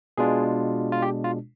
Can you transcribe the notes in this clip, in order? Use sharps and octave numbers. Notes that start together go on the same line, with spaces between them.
B2 G#3 D4 F4 G#4
F4
G4
F4